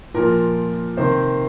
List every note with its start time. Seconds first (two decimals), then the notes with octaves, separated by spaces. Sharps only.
0.14 A#2 F3 A#4
0.97 C3 D#3 C5